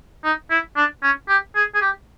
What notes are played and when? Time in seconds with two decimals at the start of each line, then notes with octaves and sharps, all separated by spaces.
0.24 D#4
0.50 E4
0.76 D4
1.03 C#4
1.29 G4
1.56 G#4
1.75 G#4
1.82 G4